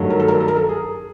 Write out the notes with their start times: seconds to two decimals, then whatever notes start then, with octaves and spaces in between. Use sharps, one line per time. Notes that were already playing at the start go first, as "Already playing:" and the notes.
Already playing: G2 D#3 F#3 A3
0.10 A#4
0.20 A4
0.28 A#4
0.40 A4
0.48 A#4
0.56 A4
0.69 G#4